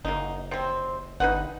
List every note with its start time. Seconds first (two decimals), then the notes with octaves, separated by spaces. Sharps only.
0.05 F#1 A#3 D#4
0.51 C3 C4
1.20 G1 D#4 B4 F#5